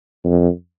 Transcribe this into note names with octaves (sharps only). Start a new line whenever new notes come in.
F2